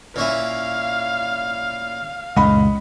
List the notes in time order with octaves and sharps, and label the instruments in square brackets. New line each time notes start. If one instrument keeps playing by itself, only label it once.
[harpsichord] A#2 C#4 E4 [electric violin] F5
[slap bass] C#2 F#2 A#2 [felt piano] D#5 F#5 B5